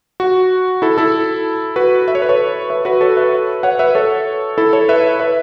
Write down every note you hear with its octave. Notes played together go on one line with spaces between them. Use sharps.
F#4
E4 A4
E4 A4
F#4 B4
E5
C#5
B4
A4 C#5
B4 E5
F#4 B4
A4 C#5
B4 E5
C#5 F#5
B4 E5
A4 C#5
E4 A4
A4 C#5
B4 E5
B4 E5